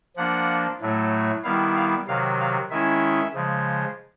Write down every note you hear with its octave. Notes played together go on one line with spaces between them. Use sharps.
F3 A#3 D4 F#5
A2 F#3 A3
D#3 G3 B3 E4 F5
F5
C3 D#3 F#3 F5
F5
D#3 G#3 C#4 E4 E5
C#3 F3 G#3